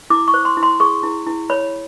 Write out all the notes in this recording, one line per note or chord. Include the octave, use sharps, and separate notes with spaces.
E4 D6
C#6
C5
C6
E4
C6
G#4 C#6
E4
E4
C#5 B5